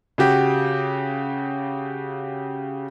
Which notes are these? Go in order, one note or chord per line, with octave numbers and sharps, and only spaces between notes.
C#3 F#4 G4